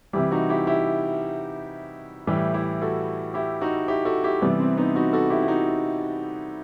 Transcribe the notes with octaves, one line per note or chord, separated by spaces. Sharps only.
C3 E3 G3 E4 G4
D#4 F#4
E4 G4
E4 G4
A2 E3 G3 E4 G4
E4 G4
F#4 A4
E4 G4
D#4 F#4
E4 G4
F#4 A4
E4 G4
C3 E3 G3 B3
C4
B3 D#4
D#4 F#4
F#4 A4
E4 G4
E4
D#4 F#4